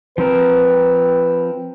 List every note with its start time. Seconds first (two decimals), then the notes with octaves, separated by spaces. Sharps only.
0.18 F3 C4 A#4 B4